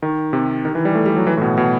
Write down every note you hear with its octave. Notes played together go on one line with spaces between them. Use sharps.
D#3
C3
D#3
E3
G3
A3
G3
F#3
E3
A2
B2
B2